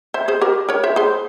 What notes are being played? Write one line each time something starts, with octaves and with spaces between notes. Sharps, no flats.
C5 E5
G#4 C5
G4 A#4
A#4 C#5
C5 E5
G#4 C5